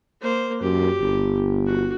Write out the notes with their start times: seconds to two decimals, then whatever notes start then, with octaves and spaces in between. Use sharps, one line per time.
0.21 A#3 C5
0.62 F#2 G4
1.02 G1
1.66 F#4